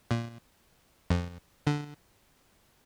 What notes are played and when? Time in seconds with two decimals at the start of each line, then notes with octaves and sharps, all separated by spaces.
0.11 A#2
1.10 F2
1.67 D3